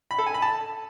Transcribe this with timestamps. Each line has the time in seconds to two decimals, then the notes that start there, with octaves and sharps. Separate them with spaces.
0.11 B5
0.19 A4
0.26 G#5
0.34 B5
0.42 A5